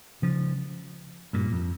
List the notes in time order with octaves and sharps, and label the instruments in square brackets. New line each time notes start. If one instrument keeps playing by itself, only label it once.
[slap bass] C#3 F3
G2 A#2
F2